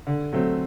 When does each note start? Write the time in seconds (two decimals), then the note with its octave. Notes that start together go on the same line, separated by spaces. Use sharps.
0.07 D3
0.33 F#3 A3 C4